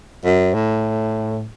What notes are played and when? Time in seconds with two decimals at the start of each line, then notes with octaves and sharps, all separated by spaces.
0.25 F#2
0.54 A2